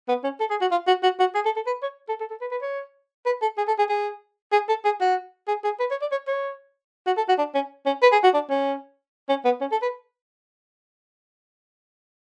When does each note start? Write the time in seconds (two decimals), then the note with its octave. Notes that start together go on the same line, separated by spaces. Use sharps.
0.08 B3
0.24 C#4
0.40 A4
0.50 G#4
0.61 F#4
0.71 F4
0.87 F#4
1.03 F#4
1.19 F#4
1.35 G#4
1.45 A4
1.56 A4
1.67 B4
1.83 C#5
2.09 A4
2.20 A4
2.30 A4
2.41 B4
2.51 B4
2.62 C#5
3.26 B4
3.42 A4
3.58 G#4
3.68 A4
3.78 G#4
3.89 G#4
4.52 G#4
4.69 A4
4.85 G#4
5.00 F#4
5.48 G#4
5.64 G#4
5.80 B4
5.91 C#5
6.01 D5
6.11 C#5
6.27 C#5
7.07 F#4
7.17 A4
7.28 F#4
7.38 D4
7.54 C#4
7.86 C#4
8.02 B4
8.12 G#4
8.24 F#4
8.34 D4
8.50 C#4
9.29 C#4
9.45 B3
9.61 C#4
9.72 A4
9.82 B4